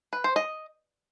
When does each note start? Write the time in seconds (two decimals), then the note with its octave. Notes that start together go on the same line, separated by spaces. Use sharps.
0.13 B4
0.24 C5
0.36 D#5